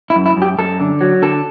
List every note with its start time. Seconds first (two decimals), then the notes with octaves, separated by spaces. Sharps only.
0.10 E4
0.16 F#2
0.26 E4
0.37 F#2
0.42 G4
0.58 F#2 A4
0.80 D3
1.01 F#3
1.22 D3 A4